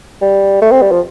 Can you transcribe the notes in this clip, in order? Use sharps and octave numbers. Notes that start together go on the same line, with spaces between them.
G3
A3
C4
G3
F3